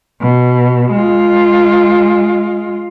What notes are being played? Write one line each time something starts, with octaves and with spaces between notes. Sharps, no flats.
B2
G#3 F4